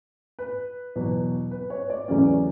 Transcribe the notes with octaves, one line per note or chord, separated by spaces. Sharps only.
B4
E2 B2 F#3
B4
C#5
D5
E2 C#3 F#3 A3 C#4 D5